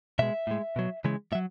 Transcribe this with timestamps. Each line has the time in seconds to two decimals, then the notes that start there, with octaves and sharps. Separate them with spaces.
0.19 B2 G#3 E5
0.47 A2 G#3
0.76 B2 F#3
1.05 C#3 E3 G#3
1.32 A2 E5
1.35 F#3